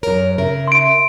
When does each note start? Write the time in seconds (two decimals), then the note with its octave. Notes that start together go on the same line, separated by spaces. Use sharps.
0.03 F#2 A#4 C#5
0.38 C#3 A#4 E5
0.68 C6 D7